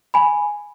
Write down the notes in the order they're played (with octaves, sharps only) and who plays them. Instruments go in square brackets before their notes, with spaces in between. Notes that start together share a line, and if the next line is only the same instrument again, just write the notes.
[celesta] G#5 B5